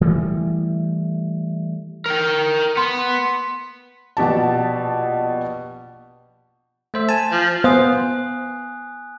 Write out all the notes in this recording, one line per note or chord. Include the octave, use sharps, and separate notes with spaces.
E3 G3 A3
A#4 G5
B3 C6
A#1 B2 G4 A5
A3 C5 E5
G#5 A5
F3
B3 C5 F5 G#5 D#6 F#6